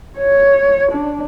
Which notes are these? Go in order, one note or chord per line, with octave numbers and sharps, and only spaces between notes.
C#5
D4